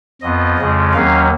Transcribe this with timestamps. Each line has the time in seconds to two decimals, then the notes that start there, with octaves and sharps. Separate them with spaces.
0.21 F2 F3 B3 D#5
0.58 F2 C#3 F3 G#3
0.93 D#2 D#3 F#3 C#4 F5